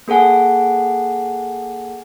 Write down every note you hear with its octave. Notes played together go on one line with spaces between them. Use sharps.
A#3 G#4 A4 F#5 G#5